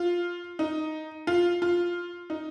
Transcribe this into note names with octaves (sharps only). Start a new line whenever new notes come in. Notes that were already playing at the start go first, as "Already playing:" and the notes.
Already playing: F4
D#4
F4
F4
D#4